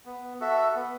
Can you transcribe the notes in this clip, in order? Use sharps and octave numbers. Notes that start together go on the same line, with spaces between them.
B3
F#4 A4 E5
B3